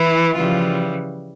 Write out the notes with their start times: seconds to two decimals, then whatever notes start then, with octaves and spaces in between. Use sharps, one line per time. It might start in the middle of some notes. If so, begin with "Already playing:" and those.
Already playing: E3 E4
0.35 C#3 E3 F3 G3 F4